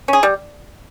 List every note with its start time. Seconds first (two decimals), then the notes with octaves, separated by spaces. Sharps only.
0.08 C#4 G#4
0.23 G3